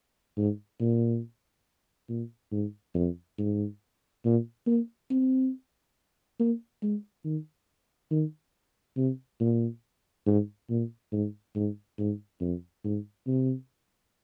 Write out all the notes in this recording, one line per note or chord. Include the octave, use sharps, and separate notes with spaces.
G#2
A#2
A#2
G#2
F2
G#2
A#2
A#3
C4
A#3
G#3
D#3
D#3
C3
A#2
G#2
A#2
G#2
G#2
G#2
F2
G#2
C3